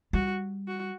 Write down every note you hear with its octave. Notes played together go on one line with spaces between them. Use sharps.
G3 F#4
F#4